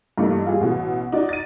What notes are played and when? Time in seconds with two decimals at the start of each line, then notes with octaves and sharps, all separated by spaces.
0.18 G2 E3 G3 A3 A#3 D#4
0.46 G3 F4 G4 G#4
0.61 A1 B2
1.12 D#4 F#4 D5
1.29 A6 D#7